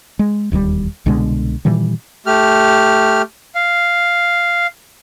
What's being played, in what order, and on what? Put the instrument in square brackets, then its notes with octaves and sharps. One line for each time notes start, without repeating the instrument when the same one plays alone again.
[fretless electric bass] G#3
E1 D#2 D#3 G3
C2 B2 D3 G#3
A#2 D#3 E3 G3
[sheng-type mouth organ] A3 G4 F6
F5